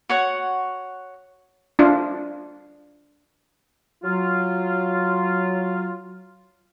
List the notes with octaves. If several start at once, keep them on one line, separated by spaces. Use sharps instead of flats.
F#4 C#5 F#5
D4 F4
F#3 F4